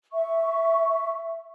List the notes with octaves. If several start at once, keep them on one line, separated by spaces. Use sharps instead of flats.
E5 C#6